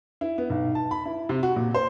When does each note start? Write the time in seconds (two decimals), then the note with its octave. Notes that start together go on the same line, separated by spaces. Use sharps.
0.21 E4
0.38 B3
0.50 B1
0.75 A5
0.91 B5
1.06 E4
1.29 C3
1.43 F#4
1.56 A#2
1.74 C5